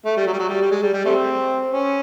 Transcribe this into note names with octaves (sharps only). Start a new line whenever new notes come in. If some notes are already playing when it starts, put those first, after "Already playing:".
A3
G3
F#3
G3
F#3
G3
G3
G#3
G3
G3
G3 A3 C4
C#4